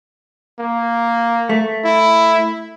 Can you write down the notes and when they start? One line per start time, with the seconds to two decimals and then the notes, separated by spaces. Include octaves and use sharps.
0.60 A#3
1.49 A3
1.85 E4